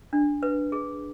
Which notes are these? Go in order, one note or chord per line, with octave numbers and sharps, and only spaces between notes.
D4
B4
G#4